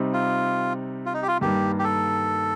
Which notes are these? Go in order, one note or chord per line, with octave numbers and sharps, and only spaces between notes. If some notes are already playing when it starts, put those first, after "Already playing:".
Already playing: C3 G3 C4 D#4
F4
F4
D#4
G4
F4
G2 D#3 G3 A#3 G4
G4
A4